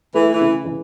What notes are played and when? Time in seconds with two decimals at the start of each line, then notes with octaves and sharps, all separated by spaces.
0.14 E3 A3
0.33 E3
0.40 C#3
0.65 E3